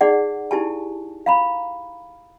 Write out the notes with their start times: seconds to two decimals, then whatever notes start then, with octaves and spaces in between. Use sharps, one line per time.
0.01 D#4 G#4 D5 F#5
0.51 D#4 E4 G4 G#5 A5
1.26 F5 A#5 B5